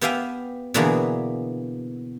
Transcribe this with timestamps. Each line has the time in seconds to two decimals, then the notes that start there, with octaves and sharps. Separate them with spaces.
0.01 B3 G4 E5 F5 G5 G#5
0.74 B2 D3 E3 A#3 B3 G#4